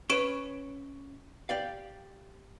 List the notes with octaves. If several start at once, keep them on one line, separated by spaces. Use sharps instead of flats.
C#4 B4 C#5 C#6 D7 E7
G4 D5 F5